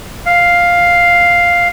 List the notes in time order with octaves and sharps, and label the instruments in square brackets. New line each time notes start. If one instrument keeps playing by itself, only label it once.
[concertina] F5